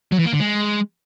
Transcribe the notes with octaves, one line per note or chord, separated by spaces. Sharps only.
F#3
E3
A#3
D3
G#3